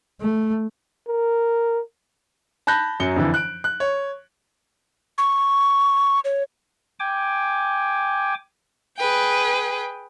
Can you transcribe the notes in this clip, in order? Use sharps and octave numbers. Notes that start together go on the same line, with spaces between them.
A3
A#4
A5 B5 F#6 G6 A#6
F#2 F#3 C#7 G7
F2 D3 E3
F#6 D7
F#6
C#5
C#6
C#5
G5 G#5 D6
G#4 B4 G5